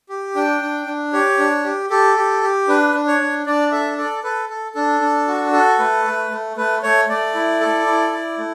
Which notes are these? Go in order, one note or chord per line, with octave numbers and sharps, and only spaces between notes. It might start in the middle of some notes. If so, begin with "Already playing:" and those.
G4
D4 G5
D4
D4
G4 C#5
D4
G4
G4 A4
G4
G4
D4 B4
D4
C#5
D4
D4 D5
A4 E5
A4 D5
A4 B4
A4
D4 A4
D4
F#4
A4
A3 B4
A3
A3
A3 B4
A3 C#5
A3 D5
E4
A4
E4
E4
A3